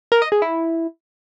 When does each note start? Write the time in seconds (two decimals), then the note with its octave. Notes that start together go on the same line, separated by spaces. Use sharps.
0.12 A#4
0.22 D#5
0.32 G#4
0.42 E4